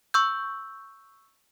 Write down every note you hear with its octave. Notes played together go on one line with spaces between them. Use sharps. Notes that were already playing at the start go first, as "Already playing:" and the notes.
C#6 E6 G6